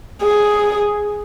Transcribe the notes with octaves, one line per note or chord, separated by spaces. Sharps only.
G#4